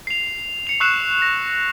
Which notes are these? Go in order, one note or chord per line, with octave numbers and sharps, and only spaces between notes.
C7 F7
C#7 F7
C#6 E6 F#6 C7 E7
A#6